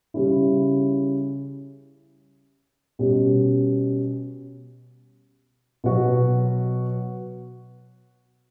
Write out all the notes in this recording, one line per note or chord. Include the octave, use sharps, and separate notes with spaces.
C#3 G3 C#4 E4
B2 G3 C#4
B2 F#3 B3 F#4